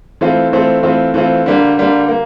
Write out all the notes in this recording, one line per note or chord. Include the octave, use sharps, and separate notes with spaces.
E3 A3 C4 F4
E3 A3 C4 F4
E3 A3 C4 F4
E3 A3 C4 F4
D3 G3 A#3
D3 G3 A#3
A#3